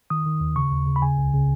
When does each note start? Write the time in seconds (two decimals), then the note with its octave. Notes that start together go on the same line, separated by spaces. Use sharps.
0.10 D#3 D#6
0.26 D#3
0.41 D#2
0.56 C#3 C#6
0.72 D#2
0.87 C#3
0.96 B5
1.02 C#3 G#5
1.18 C#2
1.34 C#3